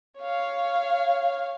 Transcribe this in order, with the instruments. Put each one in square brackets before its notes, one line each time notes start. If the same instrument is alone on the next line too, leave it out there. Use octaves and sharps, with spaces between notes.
[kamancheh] C#5 F5